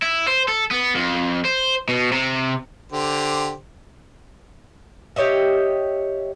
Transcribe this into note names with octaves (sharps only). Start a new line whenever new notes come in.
E4
C5
A4
B3
F2
C5
B2
C3
D3 G4 C5
G4 C#5 D#5 E5